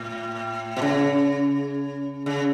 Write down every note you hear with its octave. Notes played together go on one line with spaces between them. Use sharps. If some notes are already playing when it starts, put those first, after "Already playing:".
Already playing: A2
B2
C#3
C#3